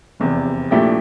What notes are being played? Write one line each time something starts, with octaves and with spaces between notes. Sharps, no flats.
F1 E2 C3
A#1 A#2 A3 E4 G4